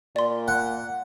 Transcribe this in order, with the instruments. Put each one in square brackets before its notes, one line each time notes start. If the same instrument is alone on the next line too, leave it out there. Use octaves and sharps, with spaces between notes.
[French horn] A#2 [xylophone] D5 C6
[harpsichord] F#5